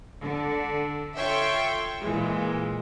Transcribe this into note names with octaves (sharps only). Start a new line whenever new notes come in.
D3
F4 A4 C#5 E5 G5 C6
A#2 E3 G#3